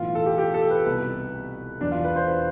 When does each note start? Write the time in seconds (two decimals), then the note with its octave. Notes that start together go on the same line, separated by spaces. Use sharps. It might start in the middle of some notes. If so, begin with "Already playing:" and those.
Already playing: B1 A2 E3 F4
0.15 A4
0.26 G4
0.38 G4
0.54 A4
0.70 B4
0.85 C2 B2 B4
1.80 E2 B2 D4
1.91 F4
2.04 B4
2.16 C5
2.28 B4